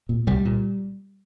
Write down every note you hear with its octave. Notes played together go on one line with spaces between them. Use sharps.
A#2
C2 G3
A#2